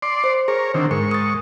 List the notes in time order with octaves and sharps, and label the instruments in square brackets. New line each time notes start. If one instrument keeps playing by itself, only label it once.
[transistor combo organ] D5 C6
[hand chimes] C5
[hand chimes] G#4 [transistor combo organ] A#4 C#5
[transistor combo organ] D3 D#3 C4
[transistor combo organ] G#2 C#6 [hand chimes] A#4
[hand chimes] D#6 A6